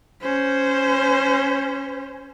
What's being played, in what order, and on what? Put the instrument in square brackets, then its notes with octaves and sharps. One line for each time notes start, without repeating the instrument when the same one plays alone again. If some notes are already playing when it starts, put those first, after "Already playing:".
[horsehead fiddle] C#4 C5